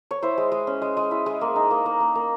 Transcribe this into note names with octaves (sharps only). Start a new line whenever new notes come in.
C#5
E4 C5
G#3
G#3
C#4
G#3
G#3
E4
G#3
A#3
D#4
A#3
A#3
A#3
A#3